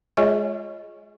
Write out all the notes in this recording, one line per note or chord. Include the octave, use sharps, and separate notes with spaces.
G#3 F4 G#4 C#5 D#5 G#5